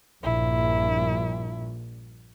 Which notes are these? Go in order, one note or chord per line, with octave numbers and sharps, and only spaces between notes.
A#1 G2 A#2 E4